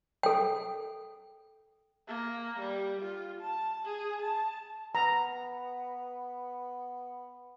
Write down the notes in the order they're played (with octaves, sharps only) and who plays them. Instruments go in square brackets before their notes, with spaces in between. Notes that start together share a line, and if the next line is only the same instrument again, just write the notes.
[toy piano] A4 G5
[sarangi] A#3
G3
F4
A5
G#4
A5
[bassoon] B3 [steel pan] A#5